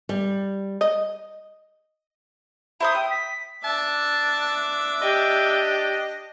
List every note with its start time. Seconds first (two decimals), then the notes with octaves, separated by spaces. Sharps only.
0.09 G3
0.81 D#5
2.80 E4 C5 A#5 D#6
2.95 G5 D#6
3.10 B6
3.64 D4 E5 A5 D6
5.02 G4 D#5